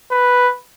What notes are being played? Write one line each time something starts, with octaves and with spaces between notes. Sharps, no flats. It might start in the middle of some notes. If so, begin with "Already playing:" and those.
B4